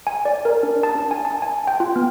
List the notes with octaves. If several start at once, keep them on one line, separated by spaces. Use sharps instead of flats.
G#5
D5
A#4
D4
A5
D4
G#5
A5
G#5
G5
F4
B3